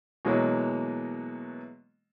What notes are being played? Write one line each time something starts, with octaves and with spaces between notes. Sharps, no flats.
B2 E3 F#3 G#3 A#3